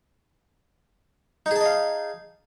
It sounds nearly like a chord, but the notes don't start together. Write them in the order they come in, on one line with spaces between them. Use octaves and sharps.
D#4 G#4 A5 D#5 F5